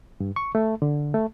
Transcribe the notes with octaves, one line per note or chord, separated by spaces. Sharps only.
G2
C#6
A3
D3
A3